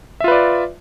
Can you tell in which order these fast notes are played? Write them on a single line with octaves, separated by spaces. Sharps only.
E5 F4 B4 D5